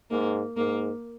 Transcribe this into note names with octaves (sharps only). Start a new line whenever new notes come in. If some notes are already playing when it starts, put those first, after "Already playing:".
G#2 A#3
G#2 A#3